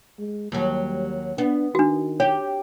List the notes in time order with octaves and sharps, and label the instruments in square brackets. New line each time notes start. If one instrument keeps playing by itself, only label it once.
[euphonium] G#3
[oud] D#2 F#3 [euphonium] G3
[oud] B3 [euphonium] D4
[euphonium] D#3 [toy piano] D4 F#4
[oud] G4 [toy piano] C#5